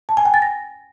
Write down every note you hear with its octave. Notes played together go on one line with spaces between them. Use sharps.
A5
G#5
G5
A6
A#6